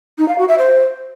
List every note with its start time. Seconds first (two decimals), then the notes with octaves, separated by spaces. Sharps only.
0.18 D#4
0.28 F5
0.38 F#4
0.48 E5
0.58 C5